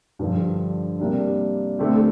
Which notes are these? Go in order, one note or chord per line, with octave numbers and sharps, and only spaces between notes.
G2 D3 F3
C3 G3 A#3 D4
D3 A3 C4 G4